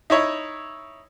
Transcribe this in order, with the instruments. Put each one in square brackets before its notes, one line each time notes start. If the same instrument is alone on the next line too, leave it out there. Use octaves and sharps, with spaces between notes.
[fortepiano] D#4 E4 C#5